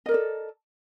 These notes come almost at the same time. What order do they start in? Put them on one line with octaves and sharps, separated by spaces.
D#5 A#4 D5 A4